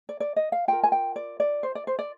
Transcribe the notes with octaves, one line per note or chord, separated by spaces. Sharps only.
D5
D5
D#5
F5
F4 A#4 G5
G#5
G5
D5
D5
C5
D5
C5
D5